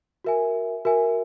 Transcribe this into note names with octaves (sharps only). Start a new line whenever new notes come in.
F#4 A#4 E5 G#5
F#4 A#4 E5 G#5